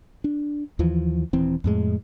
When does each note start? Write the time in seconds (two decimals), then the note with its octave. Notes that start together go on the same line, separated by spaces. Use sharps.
0.24 D4
0.79 D#2 E3 F3
1.33 D#1 E3 C4
1.64 F2 A2 G#3